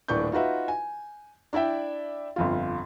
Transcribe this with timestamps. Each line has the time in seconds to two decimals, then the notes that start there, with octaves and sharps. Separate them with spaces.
0.08 D#1 A2 D4 B4 C#6 G6
0.32 D#4 F4 F#4 B4 E5
0.68 G#5
1.53 D4 E4 D5 E5 G5
2.36 G1 F2 F4